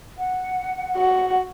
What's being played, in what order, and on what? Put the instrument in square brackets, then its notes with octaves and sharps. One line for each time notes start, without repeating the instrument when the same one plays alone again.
[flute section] F#5
[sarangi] F#4